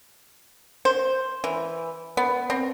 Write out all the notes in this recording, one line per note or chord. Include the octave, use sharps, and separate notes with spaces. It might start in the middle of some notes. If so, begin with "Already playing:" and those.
C5
E3
B3
C4